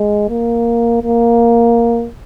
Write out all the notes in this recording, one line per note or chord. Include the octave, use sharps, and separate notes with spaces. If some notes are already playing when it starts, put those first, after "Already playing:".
Already playing: G#3
A#3
A#3